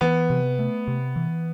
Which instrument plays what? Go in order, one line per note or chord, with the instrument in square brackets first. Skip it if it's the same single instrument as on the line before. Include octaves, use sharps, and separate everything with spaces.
[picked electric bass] E3 [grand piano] B3
[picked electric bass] C3
A3
C3
E3